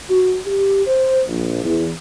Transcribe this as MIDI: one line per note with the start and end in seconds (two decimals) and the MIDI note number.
0.10 0.36 66
0.46 0.87 67
0.87 1.21 72
1.28 1.62 34
1.64 1.89 40